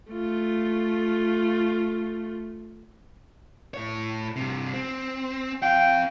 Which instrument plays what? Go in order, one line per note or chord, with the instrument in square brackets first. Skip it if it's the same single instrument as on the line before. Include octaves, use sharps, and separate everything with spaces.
[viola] A3 F4
[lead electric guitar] A2 C#5
G2 C3
C4
[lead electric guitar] C4 F5 [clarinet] G5